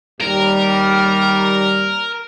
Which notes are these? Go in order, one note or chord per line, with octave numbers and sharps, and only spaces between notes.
D#2 G3 A#4